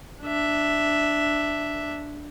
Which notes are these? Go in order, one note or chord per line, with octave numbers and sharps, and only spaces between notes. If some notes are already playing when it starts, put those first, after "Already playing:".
D4 E5